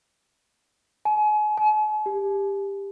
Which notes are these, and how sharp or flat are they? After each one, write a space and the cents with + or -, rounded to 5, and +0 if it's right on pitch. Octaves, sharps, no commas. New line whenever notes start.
G#5 +35
G#5 +45
G4 +15